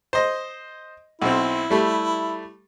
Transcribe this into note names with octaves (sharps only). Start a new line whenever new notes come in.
C5 D#5
B1 C4 E4
G3 A3